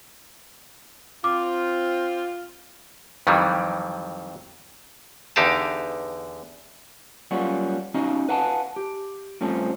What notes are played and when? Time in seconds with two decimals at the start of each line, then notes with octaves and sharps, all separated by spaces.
1.24 C4 F4 D6
3.27 F2 D#3 E3 F#3 G3
5.36 E2 D3 D#4 G4 F5 A5
7.31 F#3 G3 A#3 C#4 F4 F#4
7.94 C#4 D#4 F#4 D#5 F5
8.29 B4 F5 F#5 G#5 A5
8.76 G4
9.41 G2 F3 A3 C4 C#4